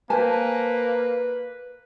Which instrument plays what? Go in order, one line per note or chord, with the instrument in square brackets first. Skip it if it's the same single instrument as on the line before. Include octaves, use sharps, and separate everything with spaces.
[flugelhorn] A#3 [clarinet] B4 [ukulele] C5 G#5 A5